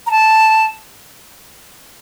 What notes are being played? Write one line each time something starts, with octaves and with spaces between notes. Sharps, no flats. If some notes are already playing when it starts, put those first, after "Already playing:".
A#5
A5